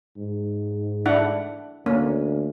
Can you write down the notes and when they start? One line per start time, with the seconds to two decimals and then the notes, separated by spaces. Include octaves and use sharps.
0.17 G#2
1.06 D4 E4 F#5
1.86 D2 A#3 C#4